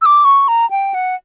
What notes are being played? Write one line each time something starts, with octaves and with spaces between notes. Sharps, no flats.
E6
D6
C#6
A#5
G5
F#5